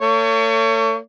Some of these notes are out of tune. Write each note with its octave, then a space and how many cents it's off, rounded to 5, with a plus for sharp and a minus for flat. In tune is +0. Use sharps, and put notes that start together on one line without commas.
A3 +45 C#5 +25